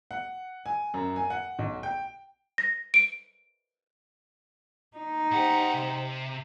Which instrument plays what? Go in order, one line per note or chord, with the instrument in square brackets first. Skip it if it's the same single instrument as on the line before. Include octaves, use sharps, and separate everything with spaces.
[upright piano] F#5
G#5
F#2
G#5
F#5
B1
G5
[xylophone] A#6
D7
[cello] D#4
[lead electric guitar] B1 F#5 [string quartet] G4 C5
[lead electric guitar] C3